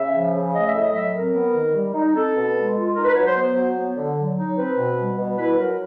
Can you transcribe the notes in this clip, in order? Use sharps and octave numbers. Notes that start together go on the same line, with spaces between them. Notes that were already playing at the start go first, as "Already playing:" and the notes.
Already playing: C#3 E5
F3
C#3
A3 D#5
E5
A2
D#5
F#3 E5
C4 A#4
B3
D#3
G3
D#4
C4 A4
B2
G#3
F4
D#4 A#4
B4
F#3 C#5
C5
B3 C5
F#3
B3
D3
F#3
D#4
C4 B4
B2
G3
B2
E4 B4
F#3 A#4